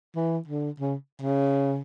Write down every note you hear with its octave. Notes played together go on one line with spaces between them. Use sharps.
E3
D3
C#3
C#3